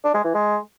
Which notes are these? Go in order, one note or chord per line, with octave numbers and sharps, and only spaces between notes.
D4
G#3
E3
G#3